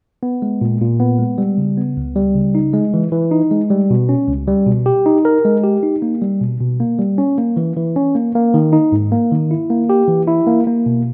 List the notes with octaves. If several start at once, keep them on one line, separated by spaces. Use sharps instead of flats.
B3
G#3
A#2
A#2
B3
G#3
G3
C#3
B3
C#2
G3
C#3
D#4
G#3
E3
E3
D#4
G#3
G3
B2
C#4
C#2
G3
B2
G4
D#4
A#4
G#3
G4
D#4
A#3
G3
B2
B2
A#3
G3
C#4
A#3
E3
E3
C#4
A#3
A#3
D#3
D#4
G#2
A#3
D#3
E4
A#3
G4
E3
E4
A#3
A#3
B2